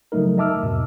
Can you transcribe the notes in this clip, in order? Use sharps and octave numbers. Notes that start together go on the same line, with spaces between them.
C#3 F3 F#3 A3 D#4 A#4
D#5 E5 A5 D6 E6 F6
E2 G#2 B2